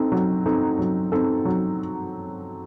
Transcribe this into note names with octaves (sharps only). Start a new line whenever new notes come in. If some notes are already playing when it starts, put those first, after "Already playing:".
Already playing: C4 D#4 A4
F#3
C4 D#4 A4
F#3
C4 D#4 A4
F#3